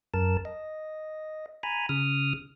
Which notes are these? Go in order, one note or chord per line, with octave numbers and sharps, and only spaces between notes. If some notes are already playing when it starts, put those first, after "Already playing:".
F#2 A#4 A5
D#5
G#5 A#5 B5
C#3 D#6 F6